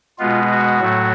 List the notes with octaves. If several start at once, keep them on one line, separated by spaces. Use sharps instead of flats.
B2 G#3 B3 F4
F#4
A2 F#3 A3